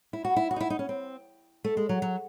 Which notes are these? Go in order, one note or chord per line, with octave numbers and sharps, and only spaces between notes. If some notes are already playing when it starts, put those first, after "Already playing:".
E4
F#4
E4
F#4
D#4
E4
D#4
C#4
C4
A3
G#3
F#3
F#3